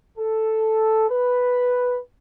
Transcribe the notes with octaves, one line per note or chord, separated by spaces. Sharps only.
A4
B4